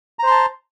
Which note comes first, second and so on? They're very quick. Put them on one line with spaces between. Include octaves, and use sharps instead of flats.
A#5 C5 C6 A5